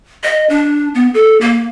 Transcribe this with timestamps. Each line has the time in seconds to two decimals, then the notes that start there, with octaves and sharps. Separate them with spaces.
0.24 D#5
0.50 D4
0.95 B3
1.14 A4
1.41 A#3